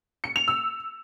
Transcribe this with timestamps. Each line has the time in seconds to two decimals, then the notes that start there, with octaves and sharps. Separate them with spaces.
0.24 C#7
0.36 F7
0.48 E6